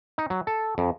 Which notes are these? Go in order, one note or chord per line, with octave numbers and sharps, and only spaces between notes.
D#4
F#3
A4
F2